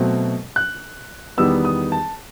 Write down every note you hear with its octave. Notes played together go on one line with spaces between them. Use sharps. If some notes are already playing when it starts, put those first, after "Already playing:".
Already playing: B2 F#3 A3 C4
F#6
E2 D#3 G3 B3 D#4 E6
D#6
A5